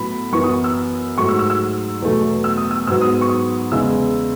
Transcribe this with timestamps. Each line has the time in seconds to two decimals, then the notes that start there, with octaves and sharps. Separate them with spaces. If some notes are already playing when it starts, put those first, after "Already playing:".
Already playing: A2 F#3 B3 B5
0.32 F#2 E3 B3 C#6
0.44 D#6
0.64 E6
1.18 G#2 F#3 A3 C#6
1.29 E6
1.39 E6
1.50 E6
2.02 E2 B2 F#3 A3
2.44 E6
2.57 D#6
2.71 E6
2.87 G#2 F#3 B3 E6
3.01 D#6
3.21 C#6
3.29 D#6
3.72 E2 C#3 G#3 E6